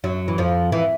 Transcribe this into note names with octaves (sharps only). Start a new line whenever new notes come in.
F#2 F#3
E3
F2 F3
E3